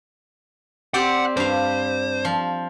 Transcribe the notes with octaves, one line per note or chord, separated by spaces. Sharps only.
C4 G4 D5 F#5
G2 C5 F5
F3